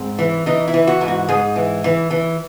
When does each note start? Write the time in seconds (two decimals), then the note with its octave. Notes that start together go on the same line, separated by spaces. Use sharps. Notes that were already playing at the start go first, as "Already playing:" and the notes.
Already playing: G#2 C4
0.19 E3
0.46 E3 D#4
0.68 E4
0.74 E3
0.87 F#4
1.01 G#2
1.08 F#4
1.29 G#2 G#4
1.56 E3
1.84 E3
2.11 E3